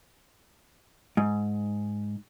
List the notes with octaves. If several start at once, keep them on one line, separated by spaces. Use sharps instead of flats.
G#2